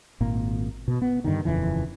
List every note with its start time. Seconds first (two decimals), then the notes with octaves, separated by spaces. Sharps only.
0.20 G#1 A#2 A#3
0.88 B2
1.02 B3
1.24 G2 D3 D#3
1.45 D#1 F2 C#3 E3